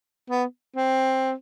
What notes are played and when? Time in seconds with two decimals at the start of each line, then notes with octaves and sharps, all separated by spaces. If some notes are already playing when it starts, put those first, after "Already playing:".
0.30 B3
0.76 C4